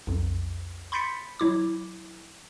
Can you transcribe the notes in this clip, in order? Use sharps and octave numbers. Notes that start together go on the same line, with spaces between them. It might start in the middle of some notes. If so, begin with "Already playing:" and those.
B1 F2
B5 C6 G6 A6 B6 C#7
F#3 E4 D6